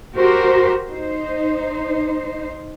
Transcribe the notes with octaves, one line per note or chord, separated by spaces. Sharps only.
F#4 G4 A#4 C5
D#4 C5